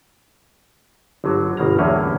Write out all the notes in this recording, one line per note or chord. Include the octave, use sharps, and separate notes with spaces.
G1 D3 F#3
G1 B2 A#3 A#5
E2 A2 D3 F#3 A#3 C#4